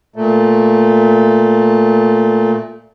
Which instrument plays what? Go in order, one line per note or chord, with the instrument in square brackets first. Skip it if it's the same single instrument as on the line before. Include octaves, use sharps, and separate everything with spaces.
[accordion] A#2 A3